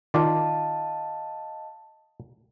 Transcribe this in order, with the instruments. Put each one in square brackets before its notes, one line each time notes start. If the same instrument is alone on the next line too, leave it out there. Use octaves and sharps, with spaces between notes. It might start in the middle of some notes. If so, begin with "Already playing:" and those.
[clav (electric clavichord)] D#3 F4 D5 [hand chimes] D#5 F5 A5